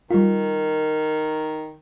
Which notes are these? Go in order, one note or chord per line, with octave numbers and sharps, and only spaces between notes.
D#3 G3 F4